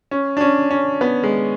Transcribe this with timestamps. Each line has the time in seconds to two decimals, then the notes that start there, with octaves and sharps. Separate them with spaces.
0.11 C#4
0.37 D4
0.41 C#4
0.71 C#4
1.01 B3
1.23 G#3